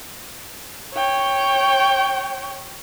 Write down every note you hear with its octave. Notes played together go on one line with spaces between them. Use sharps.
C#5 G5